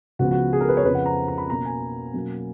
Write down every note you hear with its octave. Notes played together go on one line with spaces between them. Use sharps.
C#2 C#3 F3 B3 F#4
F#4
G#4
A#4
B4
C#5
F2 C#3 F3 B4
F#5
A#5
A#5
B5
B2 A#3 C#4 A#5
G#5
B2 F#3 A#3 C#4